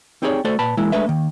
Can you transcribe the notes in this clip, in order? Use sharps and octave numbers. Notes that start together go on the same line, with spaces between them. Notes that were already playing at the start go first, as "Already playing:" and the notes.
C4 D#4 G4 G#4 C#5 D5
A3 F#4 A4 C5 D5
A#2 B4 A5 B5
E3 G#3 A#3 E4
G#3 A3 D4 B4 E5
D#3 A#3